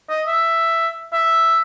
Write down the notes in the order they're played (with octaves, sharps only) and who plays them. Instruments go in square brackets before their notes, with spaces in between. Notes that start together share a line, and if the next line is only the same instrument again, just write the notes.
[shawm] D#5
E5
E5